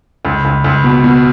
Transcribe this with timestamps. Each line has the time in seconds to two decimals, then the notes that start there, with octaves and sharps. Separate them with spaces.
0.25 C#2
0.45 C#2
0.64 C#2
0.84 B2
1.04 B2